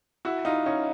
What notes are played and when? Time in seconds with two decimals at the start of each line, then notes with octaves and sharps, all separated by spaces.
0.25 E4 F#4
0.45 D#4 F4
0.66 C#4 D#4